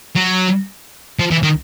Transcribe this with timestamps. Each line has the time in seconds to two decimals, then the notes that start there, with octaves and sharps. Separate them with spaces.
0.16 F#3
1.19 F3
1.31 E3
1.43 D#3